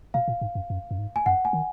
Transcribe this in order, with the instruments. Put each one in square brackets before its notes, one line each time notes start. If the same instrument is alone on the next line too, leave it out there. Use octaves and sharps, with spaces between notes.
[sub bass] B2 [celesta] F5
[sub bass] A#2
G#2
F#2
F#2
F#2
G#2
[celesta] G#5
[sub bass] F#2 [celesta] F#5
[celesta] G#5
[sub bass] D#3